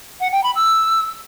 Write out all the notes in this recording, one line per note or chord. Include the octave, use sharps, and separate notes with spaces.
F#5
G5
B5
E6